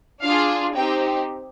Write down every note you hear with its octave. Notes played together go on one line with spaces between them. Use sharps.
D4 F4 G#4 F5
C4 D#4 G4 G5